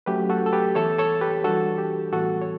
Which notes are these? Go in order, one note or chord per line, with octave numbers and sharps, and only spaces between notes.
F#3 A3 C#4 G4 B4
F#4 A4
A4
G4 B4
E3 B3 E4 A4 C#5
A4 C#5
G4 B4
E3 G3 D4 F#4 A4
G4
A2 E3 G3 B3 F#4 A4
C#5